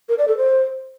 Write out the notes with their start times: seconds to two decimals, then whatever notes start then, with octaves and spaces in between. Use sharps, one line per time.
0.09 A#4
0.18 D5
0.28 A4
0.37 C5